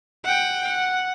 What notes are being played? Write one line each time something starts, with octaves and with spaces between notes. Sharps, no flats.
F#5 G5
F#5